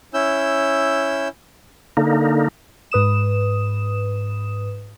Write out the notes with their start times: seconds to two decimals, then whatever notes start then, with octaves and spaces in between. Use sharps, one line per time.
0.14 C#4 E4 E6 G6
1.97 D3 A#3 D#4
2.92 G#2 B4 D#6 E7